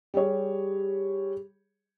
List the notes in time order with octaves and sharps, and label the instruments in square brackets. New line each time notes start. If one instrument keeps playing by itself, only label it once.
[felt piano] G3 G4 G#4 C#5